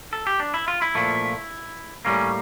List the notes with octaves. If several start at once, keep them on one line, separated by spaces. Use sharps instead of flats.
A4
G4
D4
E4
F4
E4
A#2 F3 A3
A2 G3 A#3 C#4